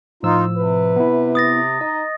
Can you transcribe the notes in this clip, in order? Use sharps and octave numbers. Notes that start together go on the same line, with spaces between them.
A2 F3 D#4 F4 E6
C3 B4
B3 E4
D#6 A6 A#6
D#4 D#5